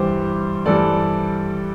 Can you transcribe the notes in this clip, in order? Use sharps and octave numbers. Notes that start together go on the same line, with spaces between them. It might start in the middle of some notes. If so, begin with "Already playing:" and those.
Already playing: G2 E3 G3 G4 C5
G2 E3 G3 A4 D5